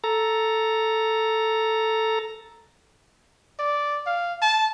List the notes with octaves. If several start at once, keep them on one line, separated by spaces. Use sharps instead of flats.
A4 A#5
D5
F5
A5